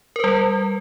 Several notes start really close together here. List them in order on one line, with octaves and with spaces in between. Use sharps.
A#4 B4 G3